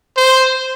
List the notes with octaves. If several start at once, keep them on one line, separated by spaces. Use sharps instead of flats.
C5